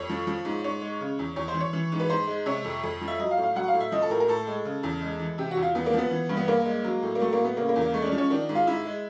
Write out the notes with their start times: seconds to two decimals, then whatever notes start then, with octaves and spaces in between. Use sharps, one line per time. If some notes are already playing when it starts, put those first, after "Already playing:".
Already playing: F2 C#5
0.09 F3
0.27 F3
0.45 G#2
0.64 G#2 C#5
0.81 G#3
1.01 C#3
1.19 E2
1.36 E2 C#5
1.48 C5
1.54 E3
1.60 C#5
1.73 E3
1.92 G#2
2.00 B4
2.10 G#2 C5
2.27 G#3
2.46 C3 C#5
2.65 F2
2.83 F2
3.01 F3
3.08 E5
3.19 F#3 D#5
3.31 F5
3.37 A2
3.43 F5
3.56 F#3 F#5
3.68 F5
3.73 A2
3.80 E5
3.92 F3 D#5
4.02 A4
4.10 A2 A#4
4.20 A#4
4.28 A2 A4
4.47 G#3
4.65 C#3
4.83 E2
5.02 G#3
5.19 E3
5.38 C3 G4
5.51 F#4
5.57 E2
5.62 F4
5.75 E2 B3
5.86 A#3
5.93 F3 B3
6.11 E3
6.29 G2
6.37 B3
6.48 G2 A#3
6.66 G#3
6.84 F#3
7.02 A2
7.15 A#3
7.20 F#3 A3
7.33 A#3
7.39 A2
7.45 B3
7.57 C#3 A#3
7.69 A#3
7.76 E2
7.81 A#3
7.93 G#3 A3
8.02 D4
8.07 C#4
8.12 F3
8.18 C#4
8.30 D#3 D4
8.49 G#2
8.55 F4
8.67 G#2 E4
8.85 G#3